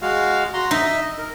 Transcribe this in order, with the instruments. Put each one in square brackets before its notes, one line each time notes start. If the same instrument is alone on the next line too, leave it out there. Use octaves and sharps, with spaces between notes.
[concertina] G#3 F#4 F5
F#4 A#5 C6
[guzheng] D#4 [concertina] D#5 E5
[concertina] A#4